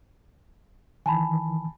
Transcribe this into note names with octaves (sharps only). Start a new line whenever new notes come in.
D#3 E3 G#5 A5 B5